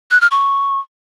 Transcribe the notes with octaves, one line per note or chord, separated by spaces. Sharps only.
F#6
F6
C#6